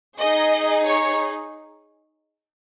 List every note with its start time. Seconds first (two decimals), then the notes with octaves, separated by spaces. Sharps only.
0.19 D#4 G#4 D#5
0.87 C#5